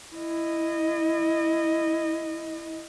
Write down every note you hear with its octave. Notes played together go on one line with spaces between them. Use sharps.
E4 D#5